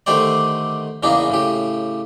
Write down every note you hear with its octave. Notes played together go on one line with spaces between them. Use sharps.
D3 D#3 A3 G4 C5 D5
E2 C#3 A#3 B3 D4 D#4
A2 C#3 G4